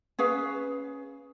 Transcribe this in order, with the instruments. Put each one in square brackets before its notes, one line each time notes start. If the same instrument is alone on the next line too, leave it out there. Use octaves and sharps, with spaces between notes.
[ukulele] C#4 G#4 B4 F5